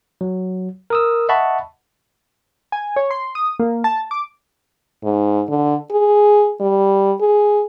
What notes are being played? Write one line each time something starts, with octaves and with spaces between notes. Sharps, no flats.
F#3
A#4 D#6 E6
D#5 E5 F#5 A5 B5 C#6
G#5
C#5
C6
D#6
A#3
A5
D6
G#2
D3
G#4
G3
G#4